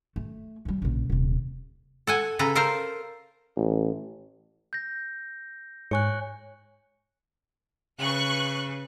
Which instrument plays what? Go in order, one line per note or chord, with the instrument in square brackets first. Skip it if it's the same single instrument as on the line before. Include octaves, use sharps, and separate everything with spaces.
[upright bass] A3
G2 G3
A#1 C#3
D#1 C3
[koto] A4 F#5 G#5
C#3 A4 B4 A#5
A4 A#4 C5 F5 A#5
[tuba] A1
[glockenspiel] G6 A#6
[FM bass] G#2 [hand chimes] C#5 G#5 F#6 [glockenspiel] C#6 C#7
[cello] C#3 B4 [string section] C#6 F#6